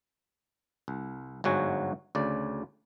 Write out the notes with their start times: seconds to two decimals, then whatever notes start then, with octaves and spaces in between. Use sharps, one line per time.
0.88 C2
1.44 G1 G#2 F#3 F#4 G#5
2.15 D2 C#3 D5